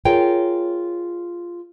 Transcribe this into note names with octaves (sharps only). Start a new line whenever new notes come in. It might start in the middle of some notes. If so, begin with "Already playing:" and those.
F4 G#4 A#4 C#5 G5